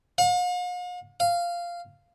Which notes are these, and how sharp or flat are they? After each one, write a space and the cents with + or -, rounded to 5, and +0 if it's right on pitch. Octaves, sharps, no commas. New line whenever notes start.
F5 +45
F5 -10